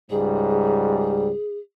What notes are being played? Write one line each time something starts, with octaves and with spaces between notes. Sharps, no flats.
C#2 G#2 G3 G#4